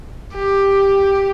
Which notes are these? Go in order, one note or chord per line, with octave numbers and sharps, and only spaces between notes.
G4